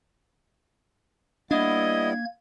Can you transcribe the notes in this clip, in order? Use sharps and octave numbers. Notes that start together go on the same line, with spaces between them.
G3 A#3 B3 D4 E4 D#5 G#6